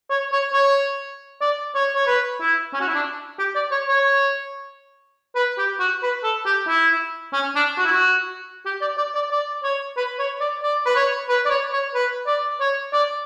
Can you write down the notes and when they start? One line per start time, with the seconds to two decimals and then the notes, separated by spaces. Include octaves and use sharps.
0.10 C#5
0.32 C#5
0.53 C#5
1.41 D5
1.75 C#5
1.95 C#5
2.07 B4
2.41 E4
2.73 C#4
2.81 F#4
2.88 E4
2.94 D4
3.39 G4
3.55 D5
3.71 C#5
3.88 C#5
5.36 B4
5.58 G4
5.80 F#4
6.03 B4
6.23 A4
6.46 G4
6.68 E4
7.33 C#4
7.55 D4
7.78 F#4
7.85 E4
7.91 F#4
8.65 G4
8.81 D5
8.98 D5
9.15 D5
9.31 D5
9.63 C#5
9.97 B4
10.19 C#5
10.40 D5
10.63 D5
10.86 B4
10.96 C#5
11.29 B4
11.46 D5
11.50 C#5
11.73 C#5
11.94 B4
12.27 D5
12.60 C#5
12.93 D5